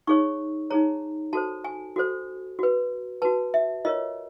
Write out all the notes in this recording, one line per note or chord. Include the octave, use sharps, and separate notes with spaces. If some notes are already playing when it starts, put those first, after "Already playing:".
D#4 G#4 C#5 C#6
D#4 G#4 C#5 A#5
F#4 A4 C5 A5
G#5
F#4 A4 C5
F#4 B4
F#4 B4 A5
E5
F4 A#4 C#5 D#5